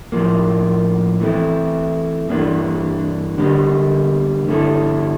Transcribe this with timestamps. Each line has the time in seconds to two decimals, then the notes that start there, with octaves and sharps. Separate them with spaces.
0.12 A2 F3 A#3
1.20 E3 A3 C4 E4
2.29 G2 E3 A#3 D4
3.38 D2 D3 G3 A#3
4.47 G2 D3 A3 E4 A4